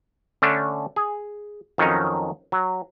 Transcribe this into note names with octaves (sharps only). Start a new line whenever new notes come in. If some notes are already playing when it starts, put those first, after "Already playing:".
D3 A3 C#4 D4
G#4
F2 D#3 F#3 C#4 D#4
F#3